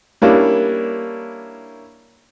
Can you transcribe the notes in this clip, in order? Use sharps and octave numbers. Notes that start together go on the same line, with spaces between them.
G3 A#3 C#4 D4 E4